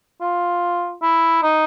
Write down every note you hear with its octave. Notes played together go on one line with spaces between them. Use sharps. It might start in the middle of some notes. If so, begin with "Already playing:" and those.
F4
E4
D#4